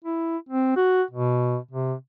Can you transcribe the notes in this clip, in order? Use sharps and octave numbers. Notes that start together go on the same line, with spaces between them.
E4
C4
F#4
B2
C3